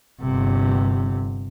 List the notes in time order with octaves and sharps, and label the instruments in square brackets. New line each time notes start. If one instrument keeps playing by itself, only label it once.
[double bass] G1 C3